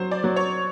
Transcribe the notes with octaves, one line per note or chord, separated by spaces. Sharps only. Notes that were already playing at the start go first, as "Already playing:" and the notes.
Already playing: F#3 C5
D5
F#3
C#5